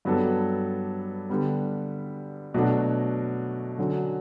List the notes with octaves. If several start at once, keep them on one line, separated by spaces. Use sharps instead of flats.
G2 F#3 B3 D4 A4
D3 G3 B3
B2 F#3 A3 D4 F#4
D3 F#3 C#4